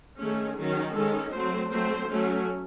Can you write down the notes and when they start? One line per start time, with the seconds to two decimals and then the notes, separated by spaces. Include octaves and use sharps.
0.19 D#3 A3 C#4 G#4
0.57 D#3 F#3 C#4
0.95 D#3 G#3 C#4 A4
1.32 F#3 A3 C4 C5
1.71 F#3 A3 C4 C5
2.09 F#3 A3 C#4